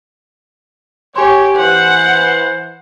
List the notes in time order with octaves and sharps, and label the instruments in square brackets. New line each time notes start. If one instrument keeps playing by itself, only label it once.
[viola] G4 [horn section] C#5 [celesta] G#5 C6
[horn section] E3 C5 [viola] F#5